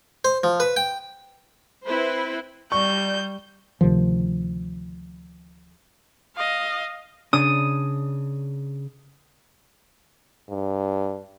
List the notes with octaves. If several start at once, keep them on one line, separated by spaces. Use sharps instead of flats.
C5
F3
B4
G5
C4 E4 B4 C5
G3 D5 C#6 G6
D2 C3 D#3 F3
D#5 F5
C#3 D4 D#6
G2